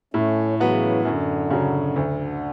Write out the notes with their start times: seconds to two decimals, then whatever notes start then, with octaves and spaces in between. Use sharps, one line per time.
0.14 A2 A3 C#4
0.60 C#3 E3 F#3 B3 F#4
1.05 F#2 D3
1.50 C#3 F#3
1.96 D2